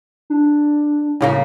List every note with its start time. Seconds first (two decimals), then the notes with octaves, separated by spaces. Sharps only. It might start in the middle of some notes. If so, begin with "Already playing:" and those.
0.30 D4
1.21 A2 C#3 A#3